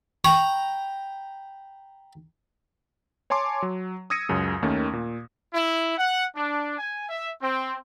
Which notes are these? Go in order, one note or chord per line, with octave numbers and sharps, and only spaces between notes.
G5 A#5 B5 C#6
C#5 G#5 A5 C6 D6
F#3
D#6 E6 G#6 A#6 C#7 D#7
C#2 F#2 C#3
D#2 D#3 A3 C#4
A#2
E4
F#5
D4
G#5
E5
C4